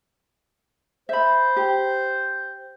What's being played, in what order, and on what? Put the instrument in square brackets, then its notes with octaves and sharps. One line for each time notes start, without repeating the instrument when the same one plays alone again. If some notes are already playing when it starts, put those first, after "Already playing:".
[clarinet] C5 [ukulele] E5 B5
[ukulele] G4